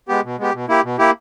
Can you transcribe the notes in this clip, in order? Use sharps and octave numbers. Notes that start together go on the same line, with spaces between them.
G#3 B3 G4
B2
G#3 B3 G4
B2
A#3 E4 G4
B2
A#3 E4 G4